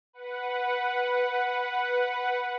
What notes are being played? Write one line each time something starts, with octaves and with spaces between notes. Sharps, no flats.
B4 F#5